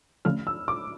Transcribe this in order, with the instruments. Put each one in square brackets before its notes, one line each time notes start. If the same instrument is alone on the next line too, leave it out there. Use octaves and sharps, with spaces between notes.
[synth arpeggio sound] D3 F3 A3 C#4 [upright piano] F6
[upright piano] E6
D6